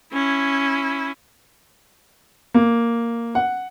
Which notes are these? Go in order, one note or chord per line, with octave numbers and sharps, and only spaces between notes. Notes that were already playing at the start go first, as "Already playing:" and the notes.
C#4 E4
A#3
F#5